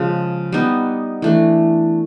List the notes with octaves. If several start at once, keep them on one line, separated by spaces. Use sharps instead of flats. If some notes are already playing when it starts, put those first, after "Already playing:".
Already playing: C#3 F3 G#3
G3 B3 D#4
E3 A3 D4